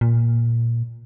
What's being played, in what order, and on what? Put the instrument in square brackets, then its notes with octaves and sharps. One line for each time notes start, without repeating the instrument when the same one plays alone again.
[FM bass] A#2